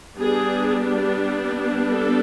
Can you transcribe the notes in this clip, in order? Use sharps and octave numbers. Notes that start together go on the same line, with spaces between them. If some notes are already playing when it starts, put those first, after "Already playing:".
G3 B3 D4 G#4
A4